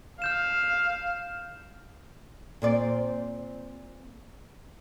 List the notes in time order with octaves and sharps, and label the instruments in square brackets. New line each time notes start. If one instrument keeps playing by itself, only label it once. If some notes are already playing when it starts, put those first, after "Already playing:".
[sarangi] F5 [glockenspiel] F6 G6 E7
[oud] A#2 C4 D5